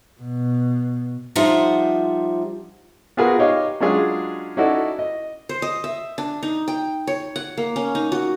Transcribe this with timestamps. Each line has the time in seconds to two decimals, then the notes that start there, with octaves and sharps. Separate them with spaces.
0.20 B2
1.36 F3 G3 D#4 F4 E5 F#5
3.17 B3 F4 F#4 G#4 A#4 B4
3.38 D#4 G4 C#5 D#5 F5
3.80 F#3 G#3 C#4 D4 F4 G#4
4.57 C#4 D#4 E4 F#4 A4 D5
4.99 D#5
5.49 C5
5.62 D#5
5.84 E5
6.18 D4
6.43 D#4
6.68 G5
7.07 C#5
7.36 F#5
7.58 A#3
7.76 C#4
7.95 D#4
8.12 F#4